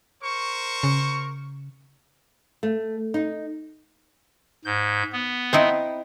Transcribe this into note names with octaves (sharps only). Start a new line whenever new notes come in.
A#4 C5 C#6
C#3
A3
D#4
G#2 G6
B3
C4 D#4 E4